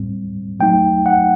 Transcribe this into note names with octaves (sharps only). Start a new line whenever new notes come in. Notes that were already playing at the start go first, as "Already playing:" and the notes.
Already playing: A2 G3 C4
F#3 A3 D#4 G5
F#5